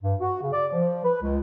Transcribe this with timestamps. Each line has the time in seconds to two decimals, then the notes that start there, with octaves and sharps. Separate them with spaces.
0.03 G2
0.20 F#4
0.42 C#3
0.53 D5
0.72 F3
1.04 B4
1.21 C#2